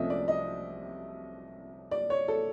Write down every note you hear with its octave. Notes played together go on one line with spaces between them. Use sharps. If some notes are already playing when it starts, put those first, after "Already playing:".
Already playing: C2 C3 F3 A3 C#4 D#5 E5
D5
D#5
D5
C#5
A4